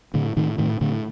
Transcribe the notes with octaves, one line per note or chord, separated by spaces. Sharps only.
A2 D3
A2 D#3
A2 D#3
A2 D3